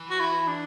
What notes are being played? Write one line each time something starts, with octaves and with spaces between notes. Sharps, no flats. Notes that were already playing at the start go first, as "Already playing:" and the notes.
Already playing: E3
F#4
E4
D4